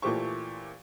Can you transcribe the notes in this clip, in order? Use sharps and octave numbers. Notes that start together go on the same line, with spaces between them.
A#2 E3 A3 G4 C5 C#6